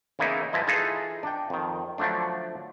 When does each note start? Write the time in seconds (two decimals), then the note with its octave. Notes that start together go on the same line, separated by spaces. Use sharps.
0.19 C#3 E3 A#3 B3 D#4 E4
0.53 G#2 E3 F3 E4 D#5
0.67 E3 D#4 F4 G#4 A4 B4
1.23 D4 G5
1.50 F2 D#3
1.98 D3 F3 F#3 A3 D4